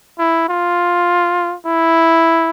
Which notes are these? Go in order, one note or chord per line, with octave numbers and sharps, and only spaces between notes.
E4
F4
E4